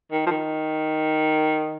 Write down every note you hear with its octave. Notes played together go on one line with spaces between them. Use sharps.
D#3
F3
D#3